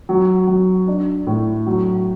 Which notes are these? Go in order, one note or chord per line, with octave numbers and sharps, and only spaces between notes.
F#3
F#3
D4
A2
F#3